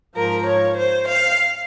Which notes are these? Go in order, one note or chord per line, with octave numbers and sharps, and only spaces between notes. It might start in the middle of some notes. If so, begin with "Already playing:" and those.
G#2 F3 A#4
C#5
C5
F5